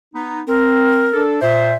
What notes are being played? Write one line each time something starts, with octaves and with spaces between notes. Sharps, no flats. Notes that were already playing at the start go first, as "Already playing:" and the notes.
B3 D#4
C4 A#4
D4 A4
A#2 C5 E5